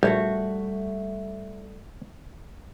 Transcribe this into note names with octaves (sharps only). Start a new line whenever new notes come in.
A#1 G3 A3 F#4